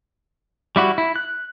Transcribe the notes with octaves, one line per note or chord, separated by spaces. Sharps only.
G3 E4 F#4
E4
F#6